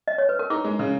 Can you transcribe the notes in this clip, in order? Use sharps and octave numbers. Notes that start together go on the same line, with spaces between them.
D#5
C#5
B4
A#4
D#4 G#4
G#3
C#3